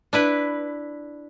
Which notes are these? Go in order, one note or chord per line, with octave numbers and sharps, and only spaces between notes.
D4 E4 B4